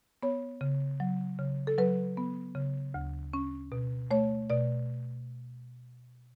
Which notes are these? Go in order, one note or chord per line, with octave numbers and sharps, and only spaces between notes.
B3 C#5
C#3
F#3
C#3
A4
F#3 B4
B3
C#3
D2
C#4
B2
A3 C#5
B2 D5